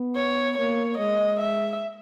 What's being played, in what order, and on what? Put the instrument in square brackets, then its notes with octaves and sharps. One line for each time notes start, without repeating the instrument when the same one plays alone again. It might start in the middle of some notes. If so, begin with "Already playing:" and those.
Already playing: [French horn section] B3
[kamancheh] C#5
[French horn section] A#3 [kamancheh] C#5
[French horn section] G#3 [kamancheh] D#5
[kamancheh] E5